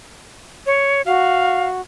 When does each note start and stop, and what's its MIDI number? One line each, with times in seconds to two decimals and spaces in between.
0.66 1.02 73
1.06 1.81 66
1.06 1.67 77